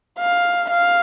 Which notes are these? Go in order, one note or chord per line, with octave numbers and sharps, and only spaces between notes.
F5
F5